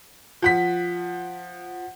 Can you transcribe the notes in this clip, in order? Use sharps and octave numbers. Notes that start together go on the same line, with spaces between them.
F3 F#5 B6